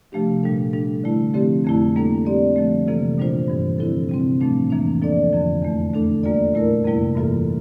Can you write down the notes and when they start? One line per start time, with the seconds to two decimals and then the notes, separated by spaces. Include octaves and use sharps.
0.12 C3 F3 A3 D4 G4
0.43 A#2 G3 D4 A4
0.73 G3 D4 A4
1.04 D3 A3 E4
1.34 D3 F3 A3 C4 G4
1.64 F2 D3 A3 E4
1.96 G3 A#3 D4 A4
2.26 G3 C4 G4 D5
2.56 D3 F3 A3
2.87 C3 E3 A#3 F4 A4
3.18 A#2 G3 D4 F4 C5
3.48 G2 E3 G3
3.78 D3 F3 C4 E4 A4
4.09 C3 G3 C4
4.41 A2 F3 A3 D4
4.70 F2 E3 A#3 D4
5.02 F3 A#3 D4 A4 D5
5.33 F2 D3 F3
5.62 E2 D3 A3
5.93 D3 A3 D4 A4
6.23 G3 A#3 F4 A4 D5
6.54 A#2 A3 E4 A#4
6.84 F2 C3 G3 A#3 E4
7.15 G2 E3 A#3 F4 A4